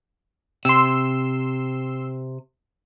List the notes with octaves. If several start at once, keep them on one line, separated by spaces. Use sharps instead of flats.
C3 C6 E6